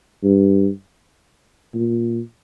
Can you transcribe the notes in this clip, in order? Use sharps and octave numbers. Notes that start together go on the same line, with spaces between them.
G2
A#2